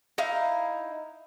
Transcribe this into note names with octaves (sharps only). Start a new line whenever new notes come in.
D#4 E4 F5